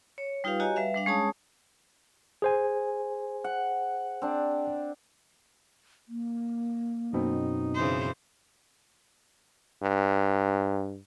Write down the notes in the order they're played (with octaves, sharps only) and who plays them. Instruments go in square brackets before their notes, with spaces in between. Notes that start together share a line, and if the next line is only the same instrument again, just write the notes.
[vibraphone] C#5
G3 D#4 F4 G4 B4 F5
F#4 G4 C#5 D#5 G#5 A#5
G3 B4 E5 F5
G3 D4 F5
G#3 C#4 G#4 C#5 A5 D#6
[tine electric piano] G#4 C5 G#5
[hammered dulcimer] F#5
C4 D4
[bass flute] A#3
[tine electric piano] F#2 B2 C4 [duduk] D#4
[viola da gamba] C#3 E3 C5
[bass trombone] G2